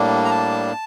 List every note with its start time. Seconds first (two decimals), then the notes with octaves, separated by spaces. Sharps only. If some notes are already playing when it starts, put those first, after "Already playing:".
Already playing: A2 G3 A#3 D4
0.25 A#5
0.31 A5